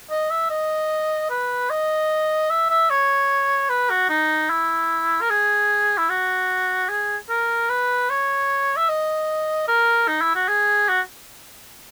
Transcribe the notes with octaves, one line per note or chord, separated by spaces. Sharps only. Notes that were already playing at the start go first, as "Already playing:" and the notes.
D#5
E5
D#5
B4
D#5
E5
E5
C#5
B4
F#4
D#4
E4
A#4
G#4
E4
F#4
G#4
A#4
B4
C#5
E5
D#5
A#4
D#4
E4
F#4
G#4
F#4